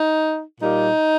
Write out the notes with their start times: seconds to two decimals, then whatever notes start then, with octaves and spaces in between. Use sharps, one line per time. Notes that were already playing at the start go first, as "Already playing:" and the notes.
Already playing: D#4
0.60 A#2 G3 A#3 D#4